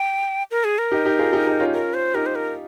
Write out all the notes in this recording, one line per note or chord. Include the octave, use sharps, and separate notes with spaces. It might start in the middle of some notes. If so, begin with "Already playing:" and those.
Already playing: G5
A#4
G#4
A#4
D#4 G4
D#4 G4
F4 G#4
D#4 G4
D#4 G4
C#4 F4
A#4
C5
D#4 G4 A#4
C5
A#4